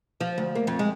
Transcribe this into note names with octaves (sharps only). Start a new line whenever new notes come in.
F3
D2
A#3
F2
G#3